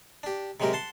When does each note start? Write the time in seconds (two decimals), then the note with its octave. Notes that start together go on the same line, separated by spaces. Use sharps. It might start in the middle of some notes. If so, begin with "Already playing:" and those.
0.23 D4 G4
0.60 C3 F#3 G#3 G4 A#4
0.73 F#5 A5 C6